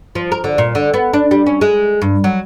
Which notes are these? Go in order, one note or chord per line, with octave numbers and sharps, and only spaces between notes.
F3
A#4
D3
A#2
D3
B3
D4
G3
C#4
G#3
G2
F#3